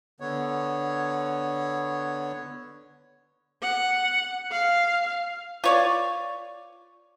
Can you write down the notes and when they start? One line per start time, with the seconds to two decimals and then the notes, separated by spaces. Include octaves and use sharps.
0.20 D3 B3 C#5
3.62 F#5
4.51 F5
5.64 F4 C#5 D5